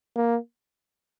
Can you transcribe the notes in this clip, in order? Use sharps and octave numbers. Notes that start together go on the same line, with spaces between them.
A#3